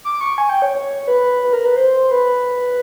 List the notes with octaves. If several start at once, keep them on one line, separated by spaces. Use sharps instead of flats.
D6
C#6
G#5
G5
C#5
C#5
B4
B4
A#4
B4
C5
B4